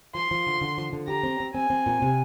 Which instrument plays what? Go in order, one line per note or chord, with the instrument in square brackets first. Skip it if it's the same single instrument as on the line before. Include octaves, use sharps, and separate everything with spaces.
[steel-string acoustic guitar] F3 [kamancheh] C6
[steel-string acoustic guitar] F3
D3
D3
F3
D3
[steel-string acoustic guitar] G4 [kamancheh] A#5
[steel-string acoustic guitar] C4
C4
[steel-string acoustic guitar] C4 [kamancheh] G#5
[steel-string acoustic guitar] C4
A#2
C3